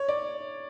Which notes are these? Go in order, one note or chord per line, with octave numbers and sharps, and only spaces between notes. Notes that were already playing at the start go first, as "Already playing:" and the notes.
Already playing: C#5
D5